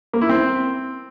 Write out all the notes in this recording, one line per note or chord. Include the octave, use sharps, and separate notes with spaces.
A#3
E4
C4